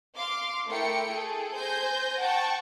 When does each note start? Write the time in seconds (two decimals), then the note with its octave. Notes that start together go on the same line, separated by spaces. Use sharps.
0.17 F5 C6 D6
0.68 A3 E4 A#4 G5 C#7
1.11 G#4 A4
1.56 C5 G#5 G6 A#6
2.20 F#5 G5 A5 C#6